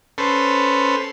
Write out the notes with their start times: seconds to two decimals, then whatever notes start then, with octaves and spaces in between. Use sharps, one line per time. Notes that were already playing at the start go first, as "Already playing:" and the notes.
0.18 C#4 A4 B4 C5